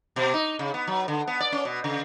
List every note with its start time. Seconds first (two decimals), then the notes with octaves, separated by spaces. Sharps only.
0.16 B2
0.34 D#4
0.59 C#3
0.74 B3
0.87 F#3
1.08 D3
1.27 B3
1.40 D5
1.52 C#4
1.65 B2
1.84 C#3